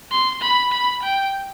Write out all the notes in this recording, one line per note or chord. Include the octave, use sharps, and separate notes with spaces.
C6
B5
B5
G5